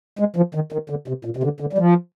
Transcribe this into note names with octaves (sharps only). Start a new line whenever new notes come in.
G#3
F3
D#3
D#3
D3
C3
A#2
C3
D3
D3
G3
F3